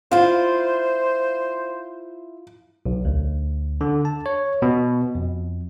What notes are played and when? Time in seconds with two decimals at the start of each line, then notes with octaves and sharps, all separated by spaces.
0.11 E4 F4 C5 F5
2.86 B1
3.05 D2
3.81 D3
4.05 A5
4.26 C#5
4.62 B2
5.15 F2